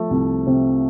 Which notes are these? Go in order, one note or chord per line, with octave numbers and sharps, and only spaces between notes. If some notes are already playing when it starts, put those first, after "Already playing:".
Already playing: F3 A3
C2
C3